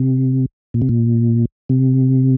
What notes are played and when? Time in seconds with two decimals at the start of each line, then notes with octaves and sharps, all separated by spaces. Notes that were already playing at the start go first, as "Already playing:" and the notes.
Already playing: C3
0.74 A#2
0.82 C3
0.89 A#2
1.69 C3